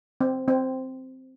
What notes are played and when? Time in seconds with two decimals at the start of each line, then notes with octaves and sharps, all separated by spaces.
0.21 C4
0.48 C4